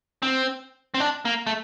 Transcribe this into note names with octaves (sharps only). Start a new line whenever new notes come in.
C4
C4
D4
A#3
A3